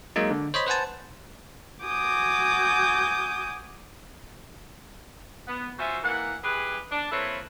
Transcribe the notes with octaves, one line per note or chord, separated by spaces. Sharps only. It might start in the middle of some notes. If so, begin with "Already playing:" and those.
F#3 G#3 A#3 D#4
D3
C5 C#5 D#5 B5
B4 C5 F#5 G#5 A5
F#4 G#5 D6 D#6 G6
B3
C#4 F4 F#4 C5 E5
E3 A#3 F#5
E3 G4 G#4 B4
D4
A#3 C4 E4 A4 B4 C#5